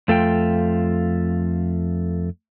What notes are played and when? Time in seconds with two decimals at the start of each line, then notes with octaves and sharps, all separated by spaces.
0.08 F2 A3 F4 G5